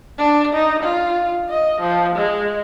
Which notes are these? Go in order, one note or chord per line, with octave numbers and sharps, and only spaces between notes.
D4
D#4
F4
D#5
F3
G#3